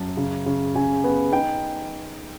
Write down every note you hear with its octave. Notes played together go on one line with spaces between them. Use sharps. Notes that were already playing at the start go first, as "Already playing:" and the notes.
Already playing: F#2 A5
C#3
C#3
C#3 G#5
B3
D#4 G5